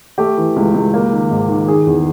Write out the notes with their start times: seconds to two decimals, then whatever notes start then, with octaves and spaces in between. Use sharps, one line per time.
0.18 A3 G4
0.38 E3
0.56 C#2
0.74 C#2
0.94 A#3
1.12 D#3
1.31 G#2
1.49 D#3
1.68 D#3 G#4
1.87 E2